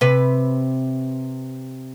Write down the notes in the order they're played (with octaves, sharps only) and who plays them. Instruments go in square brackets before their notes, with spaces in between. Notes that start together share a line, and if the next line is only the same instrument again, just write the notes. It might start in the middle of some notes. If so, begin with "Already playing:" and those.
[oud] C3 B4